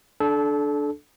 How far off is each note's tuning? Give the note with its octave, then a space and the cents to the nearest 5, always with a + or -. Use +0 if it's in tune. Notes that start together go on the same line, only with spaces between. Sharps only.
D4 +0 A4 -25